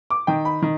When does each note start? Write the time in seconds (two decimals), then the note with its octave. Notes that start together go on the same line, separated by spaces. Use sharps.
0.10 D6
0.27 D#3 G5
0.45 B5
0.62 D#3